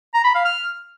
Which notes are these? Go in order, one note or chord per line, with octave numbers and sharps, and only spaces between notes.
A#5
B5
F5
F6